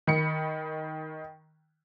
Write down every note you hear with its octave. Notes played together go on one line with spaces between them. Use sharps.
D#3 B5 C#7